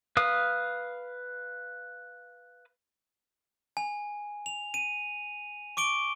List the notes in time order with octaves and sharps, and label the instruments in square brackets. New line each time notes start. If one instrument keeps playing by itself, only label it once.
[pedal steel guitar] B4 F5 D#6
[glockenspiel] G#5
F7
D#7
C#6 D6 D7 G7